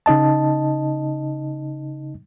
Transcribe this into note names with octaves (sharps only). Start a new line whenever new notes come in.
C#3 D#4 D#5 A5